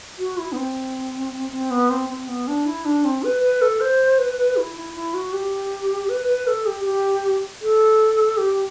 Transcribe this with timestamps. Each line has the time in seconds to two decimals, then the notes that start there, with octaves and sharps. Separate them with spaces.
0.18 F#4
0.38 E4
0.52 B3
0.56 C4
1.52 C4
1.70 B3
1.90 C4
2.09 C4
2.28 B3
2.47 D4
2.66 E4
2.85 D4
3.04 C4
3.23 B4
3.42 B4
3.61 A4
3.80 C5
4.18 B4
4.56 E4
4.76 E4
4.94 E4
5.14 F#4
5.33 G4
6.09 B4
6.28 B4
6.47 A4
6.66 G4
6.84 G4
7.61 A4
8.37 G4